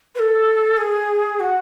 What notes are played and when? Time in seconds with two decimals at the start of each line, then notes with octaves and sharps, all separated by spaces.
0.15 B4
0.19 A4
0.77 G#4
1.39 F#4